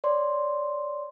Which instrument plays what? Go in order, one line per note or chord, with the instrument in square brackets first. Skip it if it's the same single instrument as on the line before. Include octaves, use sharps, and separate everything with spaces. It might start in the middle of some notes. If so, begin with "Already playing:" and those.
[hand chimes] C#5 D5 C6